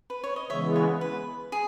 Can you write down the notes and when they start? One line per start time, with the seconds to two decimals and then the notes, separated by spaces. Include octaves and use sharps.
0.10 B4
0.24 C#5
0.36 D#5
0.50 C#3 E3 G#3 B3 C#5 E5
0.76 C#5
1.01 B4
1.52 G#4